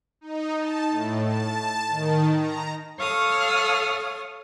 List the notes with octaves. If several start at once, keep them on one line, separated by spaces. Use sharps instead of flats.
D#4
A5
A2
A5
D#3
A#5
A4 C#5 F5 D#6 F6